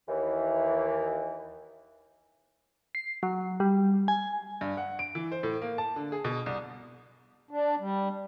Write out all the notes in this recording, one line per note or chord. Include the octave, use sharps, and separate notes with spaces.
D#2 E3
C7
F#3
G3
G#5
G2
F#5
D7
E3
C5
A2
A#3
A5
D3
G#4
B2
C2
D4
G3